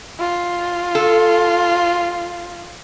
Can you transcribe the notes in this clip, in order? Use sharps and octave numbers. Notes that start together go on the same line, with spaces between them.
F4
A4